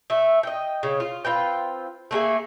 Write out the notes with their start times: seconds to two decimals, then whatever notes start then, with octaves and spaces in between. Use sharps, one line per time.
0.10 A3 E5
0.43 D#5 G5
0.83 C#3 C#5
1.00 F4
1.25 C4 F4 B4 G5
2.11 A3 A#3 G#4 E5